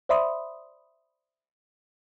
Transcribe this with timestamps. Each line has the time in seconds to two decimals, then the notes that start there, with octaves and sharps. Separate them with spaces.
0.09 C5 D5 E5 B5 C6 D#6